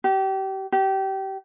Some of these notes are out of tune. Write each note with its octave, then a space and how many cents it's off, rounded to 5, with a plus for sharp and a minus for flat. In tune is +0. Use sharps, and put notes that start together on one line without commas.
G4 -30
G4 -25